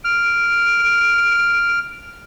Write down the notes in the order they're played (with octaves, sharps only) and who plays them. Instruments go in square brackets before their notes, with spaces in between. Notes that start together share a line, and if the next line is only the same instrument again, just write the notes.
[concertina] F6 [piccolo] D7